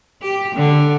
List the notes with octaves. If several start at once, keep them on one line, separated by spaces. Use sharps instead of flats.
G4
D3